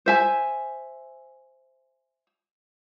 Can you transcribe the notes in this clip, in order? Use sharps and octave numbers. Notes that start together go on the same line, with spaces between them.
C5 E5 G#5